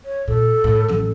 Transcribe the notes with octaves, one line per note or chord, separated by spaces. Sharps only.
C#5
A#2 A4
A2
A1 F#3